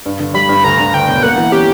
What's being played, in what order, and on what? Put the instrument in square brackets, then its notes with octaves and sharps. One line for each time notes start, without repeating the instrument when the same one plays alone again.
[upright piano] G2
D3
[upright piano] G3 [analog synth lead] B5
[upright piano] G2
[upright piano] D2 [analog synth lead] A#5
[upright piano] D3
[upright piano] D2 [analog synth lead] G5
[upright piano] E1
[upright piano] A#3 [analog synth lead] F#5
[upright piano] E3
[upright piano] C#4 [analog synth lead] G4